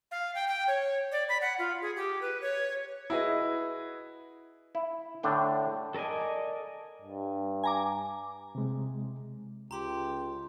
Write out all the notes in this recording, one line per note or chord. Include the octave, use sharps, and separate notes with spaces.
F5
G5
G5
C#5
D5
B5
F#5
F4
G#4
G4
B4
C#5
E4 F#4 G#4 B4 D#5
E4
A2 D3 D4 G5
A4 A#4 D5 D#5 G#5
G2
G#5 A#5 D6
C3 G#3
C#2 G4 A#5 C6